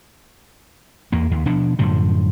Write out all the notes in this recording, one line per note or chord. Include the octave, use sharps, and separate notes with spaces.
E2 A#3
D#2
B2 F3 D4
F#2 A2 D3 F3